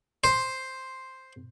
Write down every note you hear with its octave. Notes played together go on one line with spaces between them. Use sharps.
C5